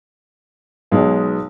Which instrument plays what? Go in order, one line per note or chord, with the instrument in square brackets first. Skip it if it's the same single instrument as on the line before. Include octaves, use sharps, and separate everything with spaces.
[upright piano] B1 B2 G#3 D#4